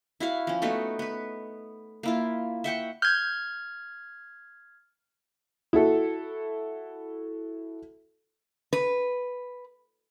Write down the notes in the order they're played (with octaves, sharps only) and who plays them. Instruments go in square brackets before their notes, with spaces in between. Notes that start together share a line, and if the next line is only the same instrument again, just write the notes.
[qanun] E4 F#4 F5
F3 C#4
A3 B3 D#4 F#4
B3 B4
A#3 E4 F4
E5 F#5 G5 C#6
[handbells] F6 G#6 [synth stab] G6
[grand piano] E4 F#4 A4
[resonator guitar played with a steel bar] B4